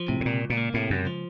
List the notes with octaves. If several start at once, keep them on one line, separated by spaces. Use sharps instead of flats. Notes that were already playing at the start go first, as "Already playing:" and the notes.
Already playing: F3
A2 C3
A2
C#2 A#2
C#2
A#2
A#3
A2 C3
C#2 F#2
F3